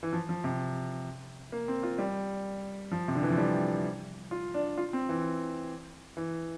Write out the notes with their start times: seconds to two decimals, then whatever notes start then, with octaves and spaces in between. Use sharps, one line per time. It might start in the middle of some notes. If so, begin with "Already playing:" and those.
0.03 E3
0.13 F3
0.29 F3
0.44 C3
1.52 A#3
1.68 C4
1.83 F4
1.98 G3
2.92 F3
3.08 C3
3.15 D3
3.23 E3
3.30 F3
3.38 G3
4.31 F4
4.54 D4
4.78 F4
4.93 C4
5.09 E3
6.17 E3